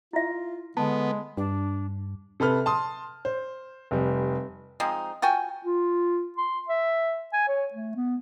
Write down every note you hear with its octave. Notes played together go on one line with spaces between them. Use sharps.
E4 F4 E5
D3 G#3 B3 A5
G2 D4
C3 A4 B4 F6
A5 C6 D#6
C5
F1 G3
F3 G#3 C4 D#4
F4 F#4 G5 G#5
F4
C6
E5
G#5
C#5
A3
B3